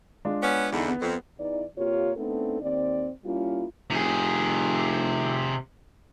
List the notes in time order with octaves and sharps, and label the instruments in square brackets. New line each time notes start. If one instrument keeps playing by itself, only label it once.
[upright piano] G#3 D4 F4
[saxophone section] B3 C#4
[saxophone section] E2 D3 [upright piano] D#4 E4
[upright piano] B3
[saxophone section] F2
[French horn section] E2 E3 D#4 D5
C3 A#3 F4 G4 C#5
A3 B3 C4 D4 D#4 A4
D#2 C4 D5
G3 A#3 C#4 E4 F4
[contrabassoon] F1 [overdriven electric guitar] C3 G#4